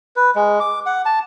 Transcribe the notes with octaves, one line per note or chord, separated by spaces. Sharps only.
B4
G#3
D6
F#5
A5